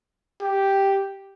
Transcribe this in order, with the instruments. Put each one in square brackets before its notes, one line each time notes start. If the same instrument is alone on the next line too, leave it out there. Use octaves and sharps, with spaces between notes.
[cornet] G4